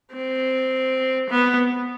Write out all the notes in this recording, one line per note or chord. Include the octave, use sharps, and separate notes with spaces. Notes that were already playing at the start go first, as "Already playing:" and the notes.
C4
B3